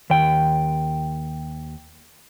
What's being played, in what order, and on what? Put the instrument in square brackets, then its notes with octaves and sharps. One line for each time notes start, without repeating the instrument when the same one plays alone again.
[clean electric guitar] D#2 G5